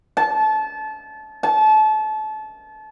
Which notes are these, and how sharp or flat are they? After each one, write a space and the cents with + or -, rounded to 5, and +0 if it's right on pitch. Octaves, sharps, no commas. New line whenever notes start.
A5 -25
A5 -30